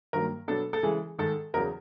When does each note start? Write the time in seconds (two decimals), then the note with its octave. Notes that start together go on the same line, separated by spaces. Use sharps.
0.13 G2 D#3 F#3 A#3 A#4
0.48 B2 F#3 B3 D4 A4
0.73 A4
0.83 C#3 E3 G#3 G#4
1.18 G#2 D#3 G#3 A4
1.54 E2 C#3 F#3 A#4